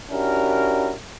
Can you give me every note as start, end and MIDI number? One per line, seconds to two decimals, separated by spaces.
0.11 0.94 61
0.11 0.94 62
0.11 0.94 64
0.11 0.94 66
0.11 0.94 67
0.11 0.94 70